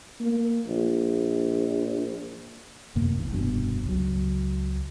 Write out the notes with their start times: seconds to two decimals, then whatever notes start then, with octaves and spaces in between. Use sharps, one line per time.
0.20 A#3
0.66 A#1
2.96 F#2 C3 A#3
3.15 A#1 E3
3.30 F1 G2 B2
3.85 C#2 F#3